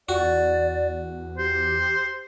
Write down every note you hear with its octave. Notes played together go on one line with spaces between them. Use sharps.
E2 F#4 D5
G4 C5